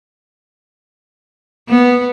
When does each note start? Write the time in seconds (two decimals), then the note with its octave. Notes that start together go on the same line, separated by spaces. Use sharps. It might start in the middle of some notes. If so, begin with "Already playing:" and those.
1.68 B3